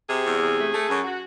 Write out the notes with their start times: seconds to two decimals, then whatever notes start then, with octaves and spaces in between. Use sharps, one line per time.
0.09 C3 G#4
0.25 E2
0.41 C3
0.57 A3
0.73 A3
0.88 F#2
1.04 F#4